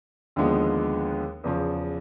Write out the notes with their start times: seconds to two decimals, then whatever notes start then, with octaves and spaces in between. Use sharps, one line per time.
0.36 D#2 D3 F3 G#3 B3
1.44 E2 C#3 F3